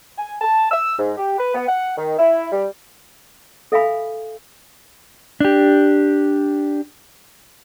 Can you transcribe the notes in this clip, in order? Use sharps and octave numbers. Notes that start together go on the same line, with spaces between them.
G#5
A5
E6
G#2
G4
B4
B3
F#5
D#3
E4
G3
A4 E5 F5 G#5 B5
D4 G4